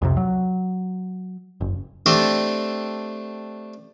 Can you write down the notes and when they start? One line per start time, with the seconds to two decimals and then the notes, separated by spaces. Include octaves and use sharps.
0.02 C2 F2 C3
0.17 F#3
1.61 F#1
2.06 A3 C4 D4 G4 A4